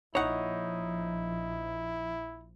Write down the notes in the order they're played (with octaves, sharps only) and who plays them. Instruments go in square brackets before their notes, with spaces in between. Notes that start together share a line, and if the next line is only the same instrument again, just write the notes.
[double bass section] A#1 F3 [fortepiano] D#4 [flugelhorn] E4 [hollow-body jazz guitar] C#5 F#5